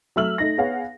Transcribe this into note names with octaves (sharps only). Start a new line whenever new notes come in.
F#3 A3 E5 E6 F6 F#7
A3 D#4 A#6
B3 G#4 C#5 F5 F#5